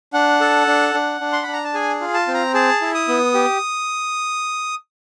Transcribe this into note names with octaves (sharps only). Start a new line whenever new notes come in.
D4 F#5
A4
D4
D4
D4
C6
D4 B5
A#5
A5
G#4 G#5
F4
A5
C4
A#5
G#4 A5
E4
D#6
B3
G4